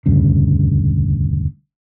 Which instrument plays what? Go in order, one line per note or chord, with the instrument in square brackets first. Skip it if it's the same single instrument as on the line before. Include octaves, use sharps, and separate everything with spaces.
[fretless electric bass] E1 D2 G2 C#3